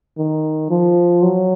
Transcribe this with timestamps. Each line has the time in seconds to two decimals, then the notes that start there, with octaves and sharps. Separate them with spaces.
0.18 D#3
0.70 F3
1.23 F#3